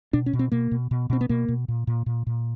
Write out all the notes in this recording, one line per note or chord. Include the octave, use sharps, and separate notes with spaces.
B2 D4
C#4
B2
C4
B2 A#3
B2
B2
B2 C4
B3
B2 A#3
B2
A#2
A#2
A#2
A#2